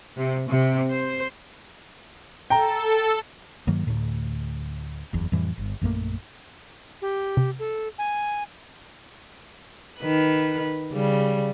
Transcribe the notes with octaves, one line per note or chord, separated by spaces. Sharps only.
C3
C3
C5
A4 G5 A#5
G2 D#3 F#3 A#3
D2 A2
F#1 E2
F2 A2 E3 G3
G1
A#1 F#2 A3 A#3
G4
C3
A4
G#5
D#3 B4
C#3 G3